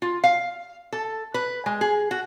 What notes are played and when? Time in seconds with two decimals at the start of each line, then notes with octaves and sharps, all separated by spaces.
0.02 F4
0.24 F5
0.92 A4
1.34 B4
1.66 G#3
1.81 G#4
2.11 F#4